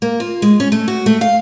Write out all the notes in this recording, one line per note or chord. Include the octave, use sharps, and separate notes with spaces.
A#3
F4
G#3
C#4
A3
F#4
A3
F5